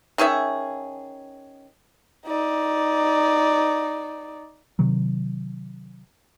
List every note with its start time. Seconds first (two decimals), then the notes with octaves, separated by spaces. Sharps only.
0.18 D#3 C#4 G#4 E5
2.26 D#4 D5
4.79 C3 D#3 F#3